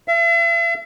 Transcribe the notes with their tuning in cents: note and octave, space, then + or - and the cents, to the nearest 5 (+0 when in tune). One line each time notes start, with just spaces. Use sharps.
E5 +40